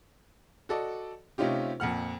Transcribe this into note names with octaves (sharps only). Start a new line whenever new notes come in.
F#4 A4 D5 D#5
C3 A3 C#4 D#4 F4 G4
F2 A#2 F#5 F6